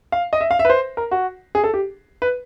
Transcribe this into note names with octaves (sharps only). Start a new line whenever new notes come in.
F5
D#5
E5
F5
E5
B4
C5
A#4
F#4
G#4
A4
G4
B4